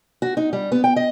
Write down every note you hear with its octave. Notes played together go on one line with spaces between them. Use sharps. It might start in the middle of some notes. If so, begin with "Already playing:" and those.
F#4
D#4
G3
B3
G5
D#5